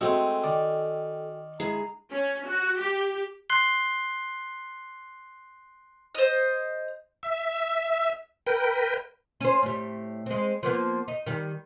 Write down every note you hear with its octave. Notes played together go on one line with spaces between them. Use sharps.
G#3 A3 C4 F#4 A4 G5 G#5
D#3 D5
G#3 E4 G#4 A#5
C#4
F#4
G4
C6 F#6 C7 G7
C5 D#5
E5
A#4 B4 G5
C#4 C5
A2 G3
G#3 C4
F3 A#3 B3
D#4
D#3 G3